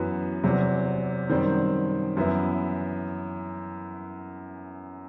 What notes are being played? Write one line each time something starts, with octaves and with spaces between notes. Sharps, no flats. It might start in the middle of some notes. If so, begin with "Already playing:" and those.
Already playing: F#2 E3 B3 F#4
E2 C3 F#3
F#2 D#3 G3 C4
F#2 E3 B3 E4